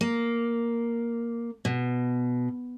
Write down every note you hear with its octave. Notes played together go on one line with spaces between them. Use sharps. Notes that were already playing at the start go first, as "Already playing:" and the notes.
A#3
B2